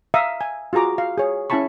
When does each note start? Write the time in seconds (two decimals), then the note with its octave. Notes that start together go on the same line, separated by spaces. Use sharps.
0.14 E5 F5 A#5 D#6
0.41 G#5
0.73 F4 F#4 G#4 A#5 D6
0.98 F5
1.18 G#4 C#5
1.50 C#4 E4 G#5 A5 B5 C#6